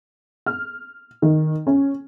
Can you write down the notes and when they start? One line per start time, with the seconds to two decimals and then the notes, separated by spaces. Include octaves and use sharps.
0.46 F6
1.22 D#3
1.67 C#4